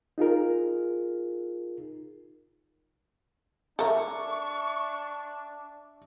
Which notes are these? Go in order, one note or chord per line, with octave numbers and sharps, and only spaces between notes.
D#4 F4 G#4 A#4
D4 A4 A#4 E5 C#6